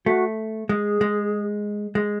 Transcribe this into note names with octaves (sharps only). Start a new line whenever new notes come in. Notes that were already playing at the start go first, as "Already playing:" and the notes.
A3 F#4
G#3 G#4
G#3
G#3